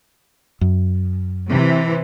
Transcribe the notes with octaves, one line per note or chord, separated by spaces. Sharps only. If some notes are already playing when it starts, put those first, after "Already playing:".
F#2
C3 E3